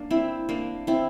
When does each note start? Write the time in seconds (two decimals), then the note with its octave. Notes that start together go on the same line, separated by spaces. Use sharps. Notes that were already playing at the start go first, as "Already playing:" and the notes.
Already playing: A#3 D4
0.11 C4 E4
0.49 A#3 D4
0.87 C4 E4